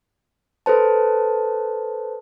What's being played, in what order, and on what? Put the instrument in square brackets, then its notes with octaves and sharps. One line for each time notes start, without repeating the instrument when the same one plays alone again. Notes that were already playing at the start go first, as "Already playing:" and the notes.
[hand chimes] A4 B4 C5 A5